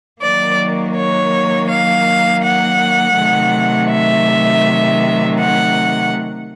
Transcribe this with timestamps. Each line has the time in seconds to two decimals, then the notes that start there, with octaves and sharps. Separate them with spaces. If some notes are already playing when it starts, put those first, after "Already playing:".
0.21 D#3 F#3 A#3 D5
0.96 C#5
1.69 F5
2.43 F#5
3.17 C3 D#3 F#3 A3
3.90 E5
5.39 F#5